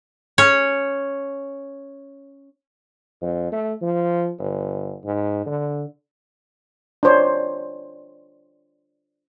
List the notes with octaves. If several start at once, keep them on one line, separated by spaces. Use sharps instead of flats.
C#4 C#5
F2
A3
F3
G1
G#2
D3
D4 F4 C5 C#5